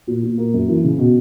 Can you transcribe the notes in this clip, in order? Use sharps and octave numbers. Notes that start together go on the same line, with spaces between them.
A#2
A#2
A#3
F#2
E3
C#3
B2